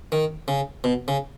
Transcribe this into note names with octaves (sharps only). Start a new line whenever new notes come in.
D#3
C#3
B2
C#3